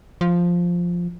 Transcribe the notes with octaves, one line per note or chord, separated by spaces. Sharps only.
F3